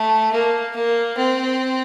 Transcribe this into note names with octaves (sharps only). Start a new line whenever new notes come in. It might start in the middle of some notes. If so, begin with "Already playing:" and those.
Already playing: A3
A#3
A#3
C4